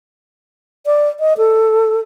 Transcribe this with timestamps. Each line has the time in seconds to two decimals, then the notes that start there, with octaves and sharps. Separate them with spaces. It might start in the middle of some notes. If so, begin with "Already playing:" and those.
0.86 D5
1.20 D#5
1.38 A4